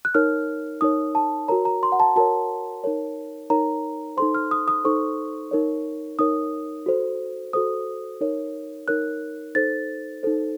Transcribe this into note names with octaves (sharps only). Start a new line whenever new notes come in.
F#6
D#4 A#4 C#5 F6
D#4 A#4 C#5 D#6
A5
F#4 A#4 C#5 A#5
A#5
C6
F#5
A5
F#4 A#4 C#5 A5
D#4 A#4 C#5
D#4 A#4 C#5 A#5
D#4 A4 C5 C6
F6
D#6
D#6
D#4 A4 C5 C#6
D#4 A#4 C#5
D#4 A#4 C#5 D#6
F#4 A4 C5
F#4 A4 C5 D#6
D#4 A#4 C#5
D#4 A#4 C#5 F#6
D#4 A4 C5 A6
D#4 A4 C5